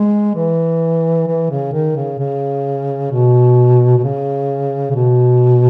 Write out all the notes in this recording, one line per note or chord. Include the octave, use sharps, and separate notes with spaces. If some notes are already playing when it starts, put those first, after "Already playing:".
Already playing: G#3
E3
E3
C#3
D#3
C#3
C#3
B2
B2
C#3
C#3
B2